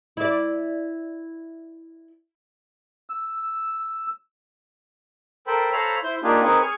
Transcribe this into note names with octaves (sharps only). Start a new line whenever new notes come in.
E4 D5
E6
A4 A#4 C5 G5 B5
A4 C5 C#5 F5 A#5 B5
E4 C5 G6
A#3 D4 D#4 F4 G4 G#4
C4 D#4 G#4 A#4 B4 C#5
G#4 G#5 C#6 F6